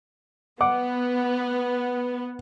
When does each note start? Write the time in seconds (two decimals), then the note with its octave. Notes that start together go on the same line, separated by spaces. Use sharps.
0.61 B3 F#5 D6